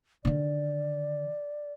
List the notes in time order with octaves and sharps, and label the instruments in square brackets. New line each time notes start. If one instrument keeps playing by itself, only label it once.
[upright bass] D3 D#3 [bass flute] D5